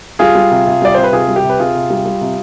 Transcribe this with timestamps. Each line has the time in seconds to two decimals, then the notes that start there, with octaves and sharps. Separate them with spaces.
0.19 G3 F4 G#4
0.35 G3
0.51 C3
0.66 C3
0.82 G3 D5
0.94 C3 C5
1.04 B4
1.13 C3 F4 G#4
1.28 G3
1.36 G4
1.44 C3
1.50 B4
1.59 C3 F4 G#4
1.75 C3
1.90 G3
2.06 G3
2.21 C3